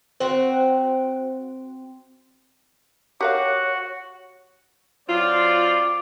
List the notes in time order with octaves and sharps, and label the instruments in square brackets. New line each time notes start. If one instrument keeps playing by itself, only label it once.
[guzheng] C4 F#4 [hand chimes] C5
[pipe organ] F#4 F#5 [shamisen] G4 A#4 F5 [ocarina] C#5
[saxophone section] F#3 C4 F4 [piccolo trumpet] D5